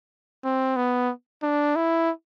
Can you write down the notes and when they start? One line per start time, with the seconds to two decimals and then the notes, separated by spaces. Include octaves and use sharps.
0.44 C4
0.76 B3
1.43 D4
1.76 E4